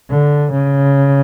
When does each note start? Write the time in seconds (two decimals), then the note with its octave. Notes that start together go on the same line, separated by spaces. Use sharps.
0.10 D3
0.52 C#3